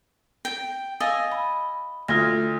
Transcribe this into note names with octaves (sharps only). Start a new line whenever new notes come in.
G5
D#5 F5 G#5 E6 A6
B5
D2 F4 G#6 A#6